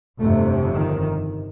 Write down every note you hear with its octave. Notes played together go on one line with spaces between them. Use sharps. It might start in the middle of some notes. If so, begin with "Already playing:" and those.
G1 F2 C3 A3
D#3